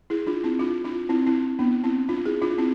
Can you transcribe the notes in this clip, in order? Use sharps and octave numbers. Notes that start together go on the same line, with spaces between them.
E4 G#4
D4 F4
C4 E4
D4 F4
D4 F4
C4 E4
C4 E4
B3 D4
C4 E4
D4 F4
E4 G#4
D4 F4
C4 E4